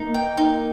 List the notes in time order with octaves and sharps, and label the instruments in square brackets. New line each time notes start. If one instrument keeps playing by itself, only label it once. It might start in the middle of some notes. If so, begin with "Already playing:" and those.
Already playing: [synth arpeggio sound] A#3 [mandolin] D#4
[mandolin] G5
D#4